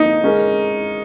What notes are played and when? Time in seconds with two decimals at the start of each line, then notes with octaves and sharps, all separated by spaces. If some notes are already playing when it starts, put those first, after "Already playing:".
Already playing: F3 A#3 D#4
0.24 G#3 C#4 A#4